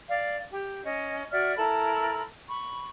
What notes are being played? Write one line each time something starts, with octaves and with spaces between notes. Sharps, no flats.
D5 F5
G4
C#4 D#5
F#4 D5 E5 F6
E4 A4 A#4 B5
B5 C#6